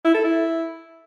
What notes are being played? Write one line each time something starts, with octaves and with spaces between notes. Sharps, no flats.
E4
A4
E4